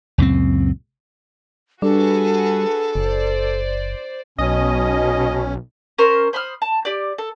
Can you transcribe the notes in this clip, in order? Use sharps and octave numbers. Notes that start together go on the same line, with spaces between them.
C#2 F#2 A#2 C4
G3 D4 F#4 G#4 A4 B4
F#1 C5 D5
B1 B2 C#4 D#5
C#4 A#4 C5
C5 B5 D#6 F6
A5
G4 D5
A4